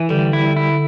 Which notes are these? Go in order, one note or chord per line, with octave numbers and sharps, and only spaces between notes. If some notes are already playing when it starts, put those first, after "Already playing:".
Already playing: E3
D3 G3
E4
E4